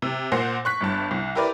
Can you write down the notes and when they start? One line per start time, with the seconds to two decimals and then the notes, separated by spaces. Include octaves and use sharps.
0.02 C3
0.32 A#2 C5 F#5 A#6 C7
0.65 C#6 F#6 B6
0.81 G1 G2 A5
1.11 C2
1.35 E4 G4 A#4 B4 D5